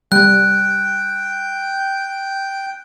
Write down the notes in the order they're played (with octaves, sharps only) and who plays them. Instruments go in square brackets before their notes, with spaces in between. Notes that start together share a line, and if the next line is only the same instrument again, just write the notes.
[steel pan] G3 [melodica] G5 [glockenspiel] F#6